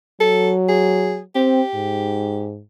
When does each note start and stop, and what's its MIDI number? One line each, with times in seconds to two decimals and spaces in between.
0.20 1.22 54
0.20 0.51 69
0.68 1.18 68
1.35 1.62 60
1.35 2.48 67
1.75 2.61 44